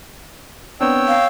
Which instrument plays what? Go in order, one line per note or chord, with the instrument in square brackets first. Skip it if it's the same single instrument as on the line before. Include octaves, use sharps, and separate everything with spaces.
[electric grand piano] B3 C4 D4 [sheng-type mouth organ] C#5 G5 E6
[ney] F5